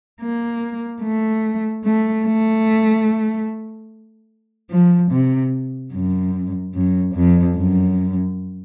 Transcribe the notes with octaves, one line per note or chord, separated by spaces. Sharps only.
A#3
A3
A3
A3
F3
C3
F#2
F#2
F2
F#2